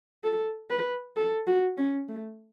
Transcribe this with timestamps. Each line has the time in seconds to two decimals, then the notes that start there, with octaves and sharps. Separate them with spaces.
0.24 A4
0.70 B4
1.16 A4
1.47 F#4
1.78 C#4
2.09 A3